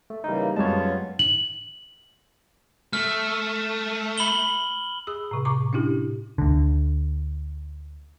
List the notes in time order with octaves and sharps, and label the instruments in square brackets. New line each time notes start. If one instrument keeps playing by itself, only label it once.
[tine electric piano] A3
[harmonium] C#3 E3 A#3 [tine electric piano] G3 D#4
[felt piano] F#2 G3 G#3 [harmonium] B3 C#4 F4 [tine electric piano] C#5 A5
[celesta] F#7
[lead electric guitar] A3 [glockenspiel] F6
[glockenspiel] B5 F#7 G7
[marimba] G#4 D#6 E6
A2 C3
A2 C#6 D6
C#4 D4 E4 G4
[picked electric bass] D2 D3